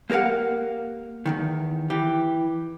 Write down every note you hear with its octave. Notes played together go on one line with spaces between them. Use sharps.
A#3 G4 A#4 F5 F#5
E2 G2 D#3
E3 G4